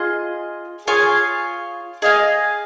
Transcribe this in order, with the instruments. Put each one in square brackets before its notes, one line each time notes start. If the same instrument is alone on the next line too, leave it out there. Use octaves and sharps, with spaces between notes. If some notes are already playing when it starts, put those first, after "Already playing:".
Already playing: [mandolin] F4 G#4 D#5
[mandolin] F4 C#5 F5 G#5 [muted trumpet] G#4
[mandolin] G#4 F5 G#5 [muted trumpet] D#5